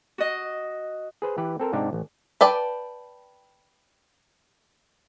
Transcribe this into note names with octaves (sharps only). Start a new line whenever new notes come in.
F#4 D#5
G#4 B4 C5
E3 G4 B4
C4 A4 A#4 C5
G#2 C3 D4 D#4 G4
A1
B4 D5 G5 A5